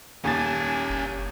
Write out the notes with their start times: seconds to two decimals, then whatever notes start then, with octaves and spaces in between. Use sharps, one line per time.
0.24 D#1 D#2 C#4 G#5 A5 A6
0.89 F#1